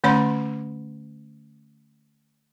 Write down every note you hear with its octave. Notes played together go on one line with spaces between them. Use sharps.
D3 A3 C#4 C#5 B5 C6